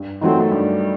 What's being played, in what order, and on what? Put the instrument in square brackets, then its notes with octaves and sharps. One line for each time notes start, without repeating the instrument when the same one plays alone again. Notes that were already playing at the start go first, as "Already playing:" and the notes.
Already playing: [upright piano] G2
[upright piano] D#3 F#3 A3 [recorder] C4
[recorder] A3
[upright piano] G2 [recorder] G3